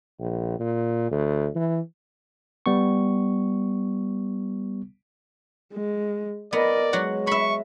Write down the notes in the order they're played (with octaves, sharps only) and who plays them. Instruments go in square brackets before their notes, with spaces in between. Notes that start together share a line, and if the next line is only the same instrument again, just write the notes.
[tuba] A#1
A#2
D2
E3
[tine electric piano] G3 B3 C#6
[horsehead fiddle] G#3
[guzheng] B3 [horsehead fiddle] A#4 D#5 [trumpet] D5
[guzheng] F#3 F#4 F#5 [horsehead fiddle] G#3
[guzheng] E5 B5 [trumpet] C#6